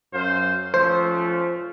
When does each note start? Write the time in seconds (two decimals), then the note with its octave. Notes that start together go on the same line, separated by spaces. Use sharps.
0.14 F#2 C5 F5
0.74 F3 A3 C#4 C5